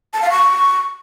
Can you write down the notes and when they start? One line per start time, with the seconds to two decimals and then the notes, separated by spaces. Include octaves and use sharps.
0.14 A5
0.22 F5
0.31 C#6